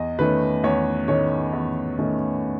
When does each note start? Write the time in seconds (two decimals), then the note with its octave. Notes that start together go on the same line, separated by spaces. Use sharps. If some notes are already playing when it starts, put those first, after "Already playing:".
Already playing: E2 D#5
0.19 D#3 A3 C#4 B4
0.64 E2 C#5
1.08 D#3 A3 C#4 C#5
1.53 E2
1.99 D#3 A3 C#4